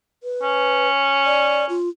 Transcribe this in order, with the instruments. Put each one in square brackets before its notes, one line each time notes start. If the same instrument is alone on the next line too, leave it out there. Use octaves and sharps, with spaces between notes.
[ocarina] B4
[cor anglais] C#4
[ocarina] D5
F4